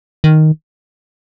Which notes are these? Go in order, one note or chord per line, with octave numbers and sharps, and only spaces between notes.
D#3